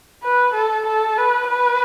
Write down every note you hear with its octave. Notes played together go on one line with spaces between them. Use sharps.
B4
A4
A4
B4
B4